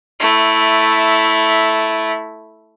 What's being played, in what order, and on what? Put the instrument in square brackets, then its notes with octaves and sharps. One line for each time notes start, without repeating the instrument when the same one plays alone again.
[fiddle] A3 E4